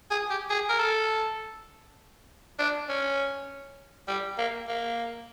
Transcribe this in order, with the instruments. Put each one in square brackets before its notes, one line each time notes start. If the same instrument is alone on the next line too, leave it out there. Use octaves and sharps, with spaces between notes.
[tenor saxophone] G#4
G4
G#4
A#4
A4
D4
C#4
G3
A#3
A#3